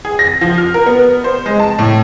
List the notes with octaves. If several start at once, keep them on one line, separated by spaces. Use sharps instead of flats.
G#4
A#6
F3
F6
A#4
B3
C5
G#3
A5
A2